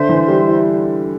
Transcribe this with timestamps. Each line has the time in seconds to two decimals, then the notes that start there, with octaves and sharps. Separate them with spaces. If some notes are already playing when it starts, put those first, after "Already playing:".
Already playing: D3 C5 E5 C6
0.09 E3
0.28 G3
0.48 E4